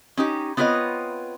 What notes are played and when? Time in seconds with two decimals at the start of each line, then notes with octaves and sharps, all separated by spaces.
0.17 C#4 D#4 G4
0.57 B3 C4 F4 B4 C#5 D#5